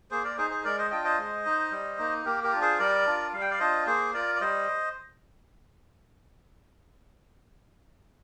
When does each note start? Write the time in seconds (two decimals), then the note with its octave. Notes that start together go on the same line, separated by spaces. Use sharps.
0.11 A#3 G#4 C5
0.24 A#4 D5
0.37 D#4 G#4 C5
0.50 G#4 C5
0.64 G#3 A#4 D5
0.78 C5 D#5
0.91 D4 F4 D#5 G5
1.04 C5 D#5
1.18 G#3
1.46 D#4
1.71 G3
1.98 A#3 D#4
2.25 A#3 G4 A#4
2.43 G4 A#4
2.52 D4 F4
2.61 G#4 C5
2.79 G3 A#4 D5
3.06 D4 F4
3.33 G3 F5
3.41 G5
3.51 D5 F5
3.59 D4 F4 C5 D#5
3.87 A#3 G#4 C5
4.14 F4 A#4 D5
4.35 D5
4.41 G3 C5 D#5